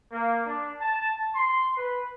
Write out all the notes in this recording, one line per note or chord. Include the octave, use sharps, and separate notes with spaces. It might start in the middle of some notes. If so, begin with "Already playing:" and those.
A#3
D4
A5
C6
B4